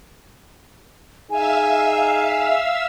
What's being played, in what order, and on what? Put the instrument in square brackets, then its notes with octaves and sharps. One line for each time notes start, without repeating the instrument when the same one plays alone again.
[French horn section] D#4 G#4 [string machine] E5 F5 E6 [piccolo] G#5